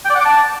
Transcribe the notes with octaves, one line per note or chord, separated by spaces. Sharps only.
G5
D5
F#5
D6
A5